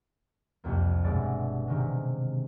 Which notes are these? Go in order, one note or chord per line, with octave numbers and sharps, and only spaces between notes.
C2 F2 A#3
G1 B2 G#3 E4 D5 A6
C3 D#3 G#3